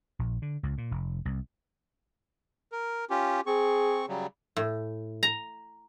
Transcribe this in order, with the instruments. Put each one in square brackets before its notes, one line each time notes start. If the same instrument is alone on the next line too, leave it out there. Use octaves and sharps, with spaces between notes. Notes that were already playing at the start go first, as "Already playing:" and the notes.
[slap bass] A#1
D3
C#2
A#2
F1
C2
[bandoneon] A#4
C#4 F4 G4
[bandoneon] C4 C#6 [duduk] G#4
[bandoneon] C#3 F#3 G3
[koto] A2
A#5